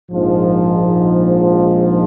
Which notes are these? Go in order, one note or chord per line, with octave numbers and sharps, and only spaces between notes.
A#1 G#2 F3